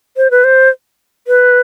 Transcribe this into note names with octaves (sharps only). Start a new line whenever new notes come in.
C5
B4
C5
B4